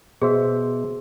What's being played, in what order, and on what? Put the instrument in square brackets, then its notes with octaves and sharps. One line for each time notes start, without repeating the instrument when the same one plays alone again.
[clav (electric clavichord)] B2 C5 E5 [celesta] G#4